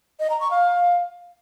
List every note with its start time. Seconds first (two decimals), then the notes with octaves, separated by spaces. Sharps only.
0.20 D#5
0.30 A#5
0.40 C#6
0.51 F5